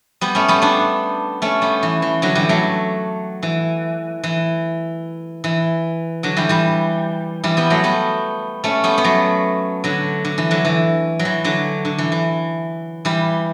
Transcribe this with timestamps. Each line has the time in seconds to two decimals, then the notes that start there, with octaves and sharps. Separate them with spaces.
0.21 G3 B3
0.35 A3 C#4
0.48 G3 B3
0.62 B3 D4
1.42 A3 C#4
1.62 G3 B3
1.83 E3
2.02 E3
2.22 D3 F#3
2.35 E3 G3
2.49 F#3 A3
3.43 E3
4.23 E3
5.44 E3
6.23 D3 F#3
6.37 E3 G3
6.49 E3 G3
7.44 E3 G3
7.57 G3 B3
7.70 F#3 A3
7.84 G3 B3
8.64 A3 C#4
8.84 G3 B3
8.98 B3
9.04 F#3 A3
9.84 D3 F#3
10.25 D3
10.38 E3
10.51 D3 F#3
10.65 E3
11.19 F#3
11.25 E3
11.44 D3 F#3
11.85 D3
11.98 E3
12.12 E3
13.05 E3 G3